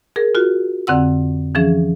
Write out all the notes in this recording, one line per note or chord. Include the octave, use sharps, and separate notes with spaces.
G#4 A#4
F4 F#4
F2 D3 C4 F#5 E6
E3 F3 C#4 G#4